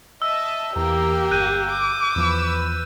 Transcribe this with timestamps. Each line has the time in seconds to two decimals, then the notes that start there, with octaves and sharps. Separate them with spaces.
0.22 D#5 E5 A5 E6
0.76 E2 E3 A#3 G4 A#4 G5
1.31 G1 F#6 G6 D#7
1.72 D6
2.16 E2 F3 B4 B5 E6